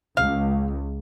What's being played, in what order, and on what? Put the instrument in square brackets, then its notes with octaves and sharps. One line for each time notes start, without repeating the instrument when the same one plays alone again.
[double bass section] C#2 [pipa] F5